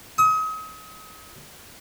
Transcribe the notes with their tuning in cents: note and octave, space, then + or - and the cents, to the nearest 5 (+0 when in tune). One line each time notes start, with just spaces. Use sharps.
D#6 +35